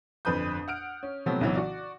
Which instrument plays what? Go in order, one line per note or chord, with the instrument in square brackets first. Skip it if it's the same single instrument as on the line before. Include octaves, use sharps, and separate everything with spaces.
[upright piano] G1 F2 B4 B5 D#6 G6
F#5 F6 D7
C#4
C3 F3 F#3 A3 B3 C4
B1 C#3 E3 F#3 B3
F#4 D5